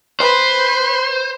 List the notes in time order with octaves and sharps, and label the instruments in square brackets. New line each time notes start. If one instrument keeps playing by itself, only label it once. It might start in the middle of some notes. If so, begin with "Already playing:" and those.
[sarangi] B4 [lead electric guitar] C5